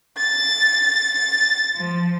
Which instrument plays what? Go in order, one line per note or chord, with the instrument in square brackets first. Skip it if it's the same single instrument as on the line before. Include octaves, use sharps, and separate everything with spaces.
[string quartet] A6
A6
F3